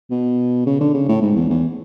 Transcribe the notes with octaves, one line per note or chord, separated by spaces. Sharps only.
B2
C#3
D3
C#3
A2
G#2
E2
E2